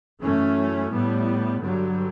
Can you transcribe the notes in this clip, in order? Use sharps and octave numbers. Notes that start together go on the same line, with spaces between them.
F#2 E3 A3 C#4
A2 G3 B3
G2 D3 F#3